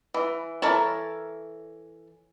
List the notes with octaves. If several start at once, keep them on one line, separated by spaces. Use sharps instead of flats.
E3
E3 A4 A#4 C#5 A5